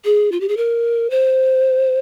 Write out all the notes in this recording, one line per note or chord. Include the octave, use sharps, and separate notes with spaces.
G#4
F4
G4
G#4
A#4
C5